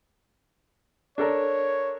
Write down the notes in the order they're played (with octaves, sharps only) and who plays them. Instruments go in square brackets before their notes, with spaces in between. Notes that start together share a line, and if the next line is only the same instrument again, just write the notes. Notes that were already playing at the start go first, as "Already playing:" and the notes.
[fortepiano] D4 A4 A#4 [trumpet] C#5